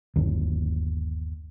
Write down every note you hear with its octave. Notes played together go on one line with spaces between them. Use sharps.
G1 D#2